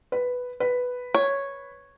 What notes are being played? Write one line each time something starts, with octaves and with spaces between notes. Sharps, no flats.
B4
B4
C#5